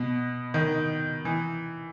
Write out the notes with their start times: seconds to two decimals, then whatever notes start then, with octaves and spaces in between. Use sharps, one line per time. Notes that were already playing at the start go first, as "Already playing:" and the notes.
Already playing: B2
0.54 D#3
1.25 E3